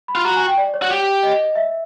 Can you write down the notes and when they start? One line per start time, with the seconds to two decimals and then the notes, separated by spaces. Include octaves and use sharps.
0.08 B5
0.15 F4
0.25 F#4 A#5
0.36 G#5
0.47 G5
0.58 D5
0.74 C#5
0.82 F#4
0.91 G4
1.23 D#5
1.56 E5